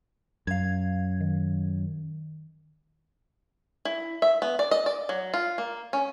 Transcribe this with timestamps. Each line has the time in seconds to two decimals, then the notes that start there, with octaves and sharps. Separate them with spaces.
0.47 F#2 F5 G#6
1.20 D#3
3.85 E4
4.22 E5
4.42 B3
4.59 D5
4.71 D#5
4.86 D5
5.09 F#3
5.34 F4
5.58 A#3
5.93 C#4